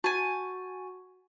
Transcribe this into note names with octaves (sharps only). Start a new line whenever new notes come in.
F#4 G#5 A5